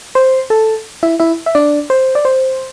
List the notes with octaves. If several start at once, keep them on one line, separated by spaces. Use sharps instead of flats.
C5 C6
A4 A5
E4 E5
E4 E5
E5
D4 D5
C5
D5
C5